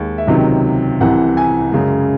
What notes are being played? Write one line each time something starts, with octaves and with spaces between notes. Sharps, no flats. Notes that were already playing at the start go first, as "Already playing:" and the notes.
Already playing: D#2 D#3 G#3
E5
C#2 C3 D#3 F#3 D#5
C2 C3 E3 F#5
G#5
F#2 C#3 G#3